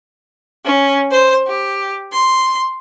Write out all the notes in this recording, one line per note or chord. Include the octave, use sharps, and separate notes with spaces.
C#4
C5
G4
C6